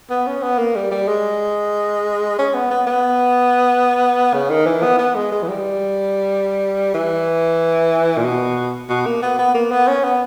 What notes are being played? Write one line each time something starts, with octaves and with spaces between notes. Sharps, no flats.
B3
C#4
B3
A#3
G3
G3
G#3
C#4
B3
B3
B3
C#3
D#3
E3
B3
B3
G#3
G#3
E3
G3
E3
A#2
B2
B2
A#3
B3
B3
A#3
B3
C#4
B3